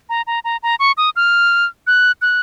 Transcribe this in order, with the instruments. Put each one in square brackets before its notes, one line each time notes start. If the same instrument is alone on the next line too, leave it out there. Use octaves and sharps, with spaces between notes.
[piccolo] A#5
A#5
A#5
A#5
C#6
D#6
F6
F#6
F#6